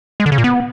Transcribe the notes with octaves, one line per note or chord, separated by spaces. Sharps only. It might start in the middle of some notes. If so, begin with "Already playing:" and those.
G#3
D3
C#3
A#2
B3